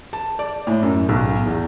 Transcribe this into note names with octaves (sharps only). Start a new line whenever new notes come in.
A5
D5
A2
F#2
B1
E2